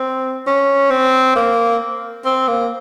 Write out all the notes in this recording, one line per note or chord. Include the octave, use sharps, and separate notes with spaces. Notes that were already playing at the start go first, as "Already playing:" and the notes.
Already playing: C4
C#4
C4
A#3
C4
A#3